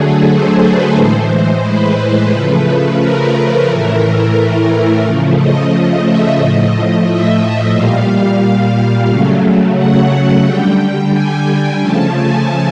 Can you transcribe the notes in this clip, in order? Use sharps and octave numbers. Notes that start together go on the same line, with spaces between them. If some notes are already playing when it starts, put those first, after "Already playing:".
Already playing: D3 F#3 A3 G#4 A4
C5
B4
A2 E3 G#3 C5
C5
B4
C#3 F3 A3
A#4
A2 E3 A3 A#4
C#3 F3 A3
D#5
D#5
E5
A2 F3 A3 D#5
E5
A#2 G3 F5
C#3 F#3 A3
F#5
F#5
D3 G3 G5
G#5
G#5
C#3 F3 A3 A5
G#5